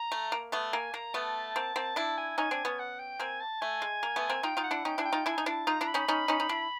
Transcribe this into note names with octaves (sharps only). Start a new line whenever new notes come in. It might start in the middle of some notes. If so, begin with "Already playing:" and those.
Already playing: A#5
A3
A#3
A3 B3
A#3 G#5
A#3 A#5
A3 B3 A5
A#3 C4
A#3 C4
D4 E4 A5
G#5
C#4 D#4 G#5
C4 D4
B3 C#4
F#5
G5
A#3 C4 G#5
A5
A3 G#5
G#3
A#3
A3 B3
A#3 C4
D#4 F4 G5
D#4 F4
F#5
D4 E4
C#4 D#4 G5
D4 E4 G#5
G5
D#4 F4
D4 E4 G#5
D#4
D4 E4 A5
D#4 F4 A#5
D4 E4
B5
C#4 D#4
C#4 D#4
C#4 D#4
D#4
D4 E4